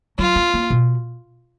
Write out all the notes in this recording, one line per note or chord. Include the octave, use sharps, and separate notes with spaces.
F#3 F4
B3
A#3
B2